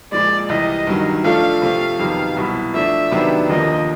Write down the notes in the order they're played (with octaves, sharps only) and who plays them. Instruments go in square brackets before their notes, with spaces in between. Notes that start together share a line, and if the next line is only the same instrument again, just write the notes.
[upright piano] A#2 F3 G#3 [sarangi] D5
[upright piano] C2 C3 E3 [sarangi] D#5
[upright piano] G2 D#3 F#3
[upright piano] F3 A3 D4 F4 A4 [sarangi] F5
[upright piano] C3 F3 A3
F2 C3 D#3 F#3 B3
C2 B2 F#3 B3 E4
[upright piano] F3 A3 D4 [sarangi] E5
[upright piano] C3 D#3 F#3 B3 D4
[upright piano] D#2 D3 F3 A#3 [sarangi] D#5